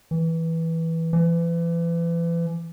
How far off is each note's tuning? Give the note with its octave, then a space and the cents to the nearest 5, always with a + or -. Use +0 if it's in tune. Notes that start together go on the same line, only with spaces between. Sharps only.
E3 -10
E3 +35